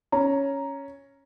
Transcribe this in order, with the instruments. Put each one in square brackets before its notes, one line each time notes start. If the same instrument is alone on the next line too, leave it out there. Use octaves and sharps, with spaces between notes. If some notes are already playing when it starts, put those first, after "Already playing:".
[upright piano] C#4 A#5